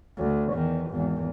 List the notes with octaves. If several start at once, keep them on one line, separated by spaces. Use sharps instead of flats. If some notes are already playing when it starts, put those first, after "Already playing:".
D2
E2 D#3
G#1 E2